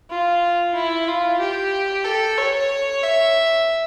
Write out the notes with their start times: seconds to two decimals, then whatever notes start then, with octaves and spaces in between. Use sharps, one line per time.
0.10 F4
0.74 E4
1.08 F4
1.40 G4
2.05 A4
2.38 C#5
3.03 E5